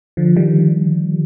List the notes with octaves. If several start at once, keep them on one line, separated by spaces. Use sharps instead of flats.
D3 F3
D#3 G3